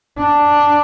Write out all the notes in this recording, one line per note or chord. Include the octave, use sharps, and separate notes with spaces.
D4